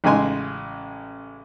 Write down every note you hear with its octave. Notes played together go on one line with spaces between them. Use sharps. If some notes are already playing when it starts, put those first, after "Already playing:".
A1 C#3 G#3 G#5 C6